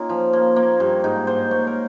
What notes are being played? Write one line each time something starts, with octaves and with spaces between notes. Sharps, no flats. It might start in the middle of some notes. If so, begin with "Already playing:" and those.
Already playing: A#3 C#4 D#4 F4
F3
A#3
A#3
G2
G#2 D#4
G#2 C5
A#3 C#5
A#4